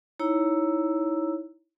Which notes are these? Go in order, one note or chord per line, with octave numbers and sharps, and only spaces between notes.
D#4 E4 C#5 A#5 E6